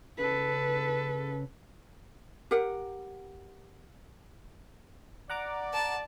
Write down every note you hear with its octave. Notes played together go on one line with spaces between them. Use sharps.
C#3 A4 B4
G4 A#4 F#5
D5 F#5 A#5 D6
A5